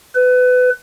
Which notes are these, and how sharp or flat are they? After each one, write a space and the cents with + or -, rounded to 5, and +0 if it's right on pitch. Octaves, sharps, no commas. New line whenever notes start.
B4 +25